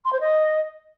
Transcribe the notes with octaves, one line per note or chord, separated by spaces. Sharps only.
C6
C5
D#5